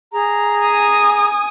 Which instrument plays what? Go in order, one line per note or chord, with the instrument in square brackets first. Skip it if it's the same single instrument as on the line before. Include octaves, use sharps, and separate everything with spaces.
[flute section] G#4 A#5
[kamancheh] G#5 D#6